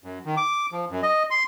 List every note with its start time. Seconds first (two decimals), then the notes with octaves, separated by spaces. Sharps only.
0.04 F#2
0.25 D#3
0.37 D6
0.72 F3
0.90 F#2
1.03 D#5
1.30 C6